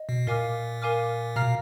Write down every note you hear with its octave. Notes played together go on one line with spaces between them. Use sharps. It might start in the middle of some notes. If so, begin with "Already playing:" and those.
Already playing: D#5
B2
A#2 A#4 F5 G#5 D6 F6
A#4 F5 G#5 D6 F6
B2 F5 A#5 F6